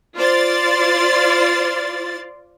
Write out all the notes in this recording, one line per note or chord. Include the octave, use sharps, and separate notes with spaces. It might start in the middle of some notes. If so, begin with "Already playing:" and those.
F4 C5 D5 C6 A6